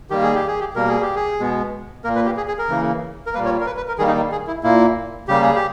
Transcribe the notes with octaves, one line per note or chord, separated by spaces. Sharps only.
D#3 G3 A#3 G4
G#4
G4
G#4
G4
B2 G3 A#3 A#4
G#4
G4
G#4
B2 G#3 B3
A#2 A#3 A#4
B4
G4
G#4
G#4
A#4
C#3 E3 A#3
A#4
A#2 G3 A#3 B4
C#5
A#4
B4
B4
A#4
D#3 G3 A#3 G#4
D#4
G#4
E4
A#2 A#3 E4
C#3 G3 A#3 G4
G#4
G4